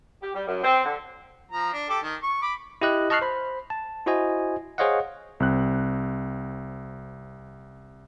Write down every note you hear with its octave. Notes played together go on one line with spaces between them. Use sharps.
G4
G3
F#2
C4
D3
F3 A#5
D4
G4 A4 D6
D#3
C#6
B5 D6
E4 G4 D#5 F#6
D#5 A5 C#6 F6 F#6 C7
C5 B5
A5
E4 F#4 C5 D#5 G#5
G#4 C5 C#5 D#5 F5 F#5
C2 C4 F#6